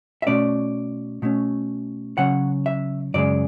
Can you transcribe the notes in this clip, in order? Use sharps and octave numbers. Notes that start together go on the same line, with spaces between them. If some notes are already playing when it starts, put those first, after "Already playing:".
E5
B2 A3 C#4 D5
B2 A3 C#4
C#3 F#3 C#4 F#5
E5
F#2 C#3 G#3 D5